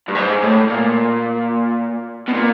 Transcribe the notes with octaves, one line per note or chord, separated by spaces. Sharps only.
G2
G#2
A2
A#2
B2
A#2